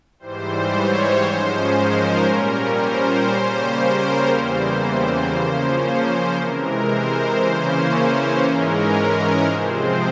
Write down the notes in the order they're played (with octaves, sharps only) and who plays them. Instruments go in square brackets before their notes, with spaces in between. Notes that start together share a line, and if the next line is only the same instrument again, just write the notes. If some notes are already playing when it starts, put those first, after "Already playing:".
[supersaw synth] G#2 E3 G3 C5
C#5
G#2 F3 G#3 C#4 C5
A#4
A#2 G3 C#4
C5
C#3 G3 A#3 C#4
A#4
E2 C#3 E3 G3 A#3 C5
C#3 F3 A#3 C#4
C5
C3 E3 G#3 A#4
C5
C#3 E3 A#3 C#4
G#2 E3 G#3 C#4 A#4
C3 F3 G#3 C4 C5